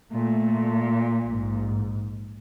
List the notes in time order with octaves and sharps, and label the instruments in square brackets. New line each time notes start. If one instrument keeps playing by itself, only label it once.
[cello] A#2 [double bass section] A3
[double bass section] A#1 G#2